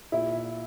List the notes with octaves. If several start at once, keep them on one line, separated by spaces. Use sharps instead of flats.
A#2 E4